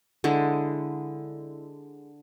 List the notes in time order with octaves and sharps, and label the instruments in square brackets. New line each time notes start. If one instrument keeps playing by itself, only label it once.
[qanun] D3 G#3 E4